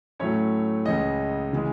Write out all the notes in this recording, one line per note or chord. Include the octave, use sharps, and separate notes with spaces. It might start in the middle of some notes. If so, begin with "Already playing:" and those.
A2 F#3 A3 C#4 C#5
C#2 C#3 G#3 C#4 D#5
C#3 E3 G#3